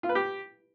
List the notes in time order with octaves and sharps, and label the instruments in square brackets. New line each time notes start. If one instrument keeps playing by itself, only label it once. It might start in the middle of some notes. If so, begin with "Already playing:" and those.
[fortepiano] F4
B4
G4